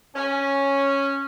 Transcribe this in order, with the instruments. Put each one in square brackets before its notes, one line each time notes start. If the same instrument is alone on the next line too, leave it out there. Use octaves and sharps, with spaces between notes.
[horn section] C#4